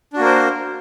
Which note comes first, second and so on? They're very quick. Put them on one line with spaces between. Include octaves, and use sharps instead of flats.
D4 F#4 A#3 A#4 C5